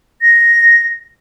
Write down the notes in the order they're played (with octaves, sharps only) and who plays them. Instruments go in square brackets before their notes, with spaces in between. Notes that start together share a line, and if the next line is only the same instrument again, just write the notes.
[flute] A#6